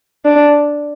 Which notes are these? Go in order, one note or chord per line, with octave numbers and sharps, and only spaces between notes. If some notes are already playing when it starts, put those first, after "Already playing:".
D4